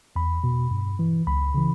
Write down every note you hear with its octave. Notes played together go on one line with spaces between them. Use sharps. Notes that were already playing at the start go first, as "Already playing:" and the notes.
E2 B5
B2
G2
E3
C#2 B5
C#3 E3